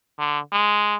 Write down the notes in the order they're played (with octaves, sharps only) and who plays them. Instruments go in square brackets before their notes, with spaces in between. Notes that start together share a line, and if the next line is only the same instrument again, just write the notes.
[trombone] D3
G#3